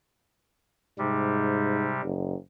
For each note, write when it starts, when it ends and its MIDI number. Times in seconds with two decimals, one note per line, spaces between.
0.99 1.95 44
0.99 2.01 48
0.99 2.01 55
2.02 2.35 30